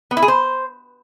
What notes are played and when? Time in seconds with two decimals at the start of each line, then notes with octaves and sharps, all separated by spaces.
0.11 B3
0.17 E4
0.22 G#4
0.28 C5